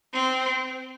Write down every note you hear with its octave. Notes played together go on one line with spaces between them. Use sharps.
C4